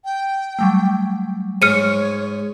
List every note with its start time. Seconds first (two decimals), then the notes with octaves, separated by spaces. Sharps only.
0.05 G5
0.59 F#3 G3 A3
1.62 G#2 C#5 F6 C#7 D#7